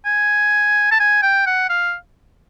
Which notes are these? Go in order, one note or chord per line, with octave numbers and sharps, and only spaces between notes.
G#5
A5
G#5
G5
F#5
F5